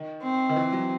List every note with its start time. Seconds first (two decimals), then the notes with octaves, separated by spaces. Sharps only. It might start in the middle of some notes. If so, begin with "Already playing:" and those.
Already playing: D#3
0.24 C4
0.49 D#3
0.56 E3
0.72 F#3